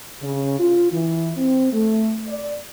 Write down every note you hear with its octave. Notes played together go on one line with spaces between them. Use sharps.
C#3
F4
E3
C4
A3
D5